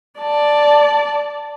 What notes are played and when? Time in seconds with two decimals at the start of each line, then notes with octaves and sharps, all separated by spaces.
0.20 D5 A5